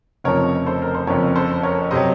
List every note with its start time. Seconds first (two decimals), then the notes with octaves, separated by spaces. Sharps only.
0.24 F1 F2 C#3 F3 A#4 C#5
0.66 A4 C5
0.82 A#4
0.95 C5
1.07 F#1 F2 C#3 F3 A#4 C#5
1.36 A4 C5
1.63 A#4 C#5
1.91 C3 F#3 C5 D#5